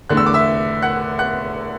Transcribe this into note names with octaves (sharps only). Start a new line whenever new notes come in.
E2 D3 A3 F#6
E6
D6
E5 E6
F#5 F#6
F#5 F#6